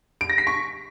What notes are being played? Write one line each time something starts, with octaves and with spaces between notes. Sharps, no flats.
D7
A#6
B6
C#6